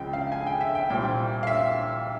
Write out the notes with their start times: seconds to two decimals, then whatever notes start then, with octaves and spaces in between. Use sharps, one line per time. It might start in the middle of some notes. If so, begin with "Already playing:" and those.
Already playing: C#2 C#3 F3 G#3 G5
0.13 F5
0.32 G#5
0.47 G5
0.61 E5
0.75 G5
0.90 C2 A#2 G3 C4 G5
1.43 F5
1.47 E5